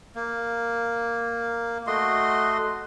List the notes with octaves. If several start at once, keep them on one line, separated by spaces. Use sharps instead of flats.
A#3
A3 F#4 D#5 C6